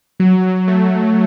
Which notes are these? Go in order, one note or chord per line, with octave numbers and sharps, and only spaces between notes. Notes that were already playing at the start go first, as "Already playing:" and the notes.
F#3
F#3
A3